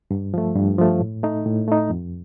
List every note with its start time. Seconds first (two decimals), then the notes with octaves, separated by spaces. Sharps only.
0.11 G2
0.34 F3 A3
0.56 G2
0.78 F3 A3
1.01 A2
1.23 A3 D#4
1.46 A2
1.68 A3 D#4
1.90 F2